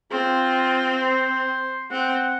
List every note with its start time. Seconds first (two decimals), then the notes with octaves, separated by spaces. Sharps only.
0.11 C4 F4
1.02 C5
1.91 C4 F#5